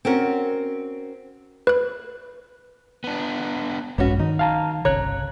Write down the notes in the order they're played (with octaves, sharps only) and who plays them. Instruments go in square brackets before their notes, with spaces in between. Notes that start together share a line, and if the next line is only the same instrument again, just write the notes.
[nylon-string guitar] C4 C#4 F#4 A#4
[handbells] B4 F#6
[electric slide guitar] B3 D4
[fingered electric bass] A#1 G2 G#3 [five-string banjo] B3 C#4 F#4
[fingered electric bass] D#3 [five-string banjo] D#4
[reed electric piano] F5 A5 A#5
[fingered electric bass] G1 C2 C#3 [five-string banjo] C#5 [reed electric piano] A#5 F#6